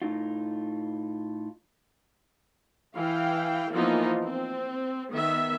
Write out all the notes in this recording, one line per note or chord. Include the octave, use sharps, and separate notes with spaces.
A2 D#4 F4
E3 F5 G5
E3 F3 A#3 B3 D#4 F4
C4
D#3 B3 E5